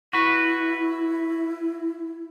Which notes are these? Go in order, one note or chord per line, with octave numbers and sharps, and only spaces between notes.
E4 F#4 B4